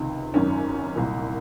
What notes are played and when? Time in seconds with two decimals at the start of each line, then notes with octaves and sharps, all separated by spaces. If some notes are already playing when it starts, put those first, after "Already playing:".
Already playing: C#2 C3 D#3
0.34 G#1 F#2 D#3 C#4
0.96 C2 A#2